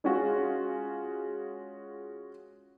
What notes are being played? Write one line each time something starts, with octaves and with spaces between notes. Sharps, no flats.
G#3 C#4 F4 F#4 G#4